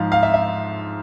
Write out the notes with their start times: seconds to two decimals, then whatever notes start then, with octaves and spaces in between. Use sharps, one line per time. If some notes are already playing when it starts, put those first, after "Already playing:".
Already playing: G#2 F3 F5
0.12 F5
0.23 E5
0.34 E5